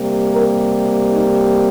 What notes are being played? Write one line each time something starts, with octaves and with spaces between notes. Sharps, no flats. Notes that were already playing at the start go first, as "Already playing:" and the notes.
Already playing: C3 G3 A#3
A#4
D#4